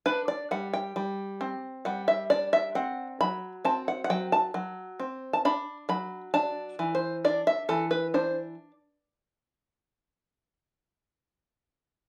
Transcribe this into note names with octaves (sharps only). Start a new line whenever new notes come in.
D4 B4
D5
G3 F#5
G5
G3
C4
G3 F#5
E5
D4 D5
E5
C4 F#5
F#3 B5
C4 A5
F#5
F#5
F#3 G5
A5
F#3
C4
A5
D4 B5
F#3 B5
D4 A5
E3
C5
D4 D5
E5
E3 A4
B4
D4 C5